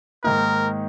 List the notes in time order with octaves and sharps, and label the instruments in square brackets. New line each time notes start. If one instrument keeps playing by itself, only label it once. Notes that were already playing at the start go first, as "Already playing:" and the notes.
[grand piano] G#2 D#3 A#3 D#4 [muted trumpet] A#4